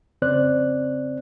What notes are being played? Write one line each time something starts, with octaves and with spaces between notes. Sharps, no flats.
F2 C#3 C4 C5 D5 F#6